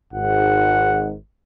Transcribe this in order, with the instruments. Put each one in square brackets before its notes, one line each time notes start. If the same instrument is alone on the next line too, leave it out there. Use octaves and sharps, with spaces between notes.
[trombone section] G#1 G#2 [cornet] F#5